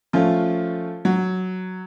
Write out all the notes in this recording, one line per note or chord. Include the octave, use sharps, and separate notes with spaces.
F3 A3 C#4 F4
F#3